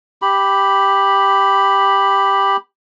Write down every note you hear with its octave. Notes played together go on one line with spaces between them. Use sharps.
G4 B5